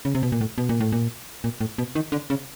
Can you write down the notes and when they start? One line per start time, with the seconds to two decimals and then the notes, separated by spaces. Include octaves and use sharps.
0.05 C#3
0.15 C3
0.23 B2
0.32 A#2
0.41 A2
0.58 B2
0.69 A#2
0.80 A2
0.92 A#2
1.44 A#2
1.61 A2
1.78 B2
1.95 D#3
2.12 D3
2.30 C#3